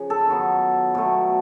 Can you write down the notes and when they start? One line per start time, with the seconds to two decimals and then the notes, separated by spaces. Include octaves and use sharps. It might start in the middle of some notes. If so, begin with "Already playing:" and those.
Already playing: C#3 F3
0.10 A4
0.27 D#3 F#3 B3
0.95 B2 F#3 A3